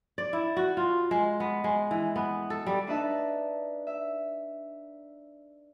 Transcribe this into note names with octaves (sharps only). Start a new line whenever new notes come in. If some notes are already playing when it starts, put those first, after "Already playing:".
D5
E4
F#4
F4
G#3
B3
G#3
E3
B3
A4
G3
D4 D#4 B4 E5 A5
E5